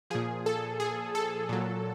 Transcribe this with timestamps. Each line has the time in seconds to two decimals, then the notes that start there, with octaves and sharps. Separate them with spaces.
0.10 A#2 F3 G#4
0.46 A4
0.80 G#4
1.15 A4
1.49 A#2 F#3